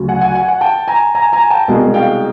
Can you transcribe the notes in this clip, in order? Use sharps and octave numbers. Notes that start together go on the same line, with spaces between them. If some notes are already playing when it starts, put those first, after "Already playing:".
Already playing: D2 C#3 F#3
F#5 G#5
F#5 G#5
F#5 G#5
F#5 G#5
G5 A5
G#5 A#5
G#5 A#5
G#5 A#5
G5 A5
C2 B2 G#3
F5 G5